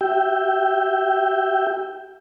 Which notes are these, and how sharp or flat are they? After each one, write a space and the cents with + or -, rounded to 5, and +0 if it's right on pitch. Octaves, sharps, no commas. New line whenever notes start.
G4 -40 E5 +0 G5 +0